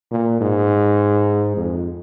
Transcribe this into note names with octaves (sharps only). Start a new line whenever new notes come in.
A#2
G#2
F2